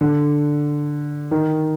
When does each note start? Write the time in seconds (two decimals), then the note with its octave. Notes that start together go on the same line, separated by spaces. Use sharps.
0.01 D3
1.31 D#3